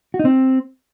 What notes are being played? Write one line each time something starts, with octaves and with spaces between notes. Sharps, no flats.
F#4
D#4
C4